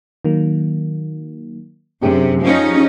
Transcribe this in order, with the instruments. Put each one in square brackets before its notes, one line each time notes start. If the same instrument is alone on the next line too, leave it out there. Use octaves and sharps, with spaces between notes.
[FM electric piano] D#3 F#3 A#3
[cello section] F#2 C3 [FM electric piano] D4 G4 G#4
[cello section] F3 C#4 D#4